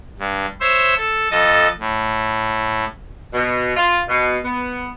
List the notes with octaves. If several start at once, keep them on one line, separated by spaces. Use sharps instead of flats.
G2
C5 C#5 E5
A4
F2 A4 D#5 A5
A2
B2
F4
B2
B3